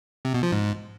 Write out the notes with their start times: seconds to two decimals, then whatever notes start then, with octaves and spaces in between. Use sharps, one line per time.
0.25 C3
0.34 B2
0.43 F3
0.52 G#2